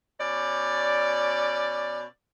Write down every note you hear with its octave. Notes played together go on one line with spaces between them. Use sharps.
B2 C#4 D5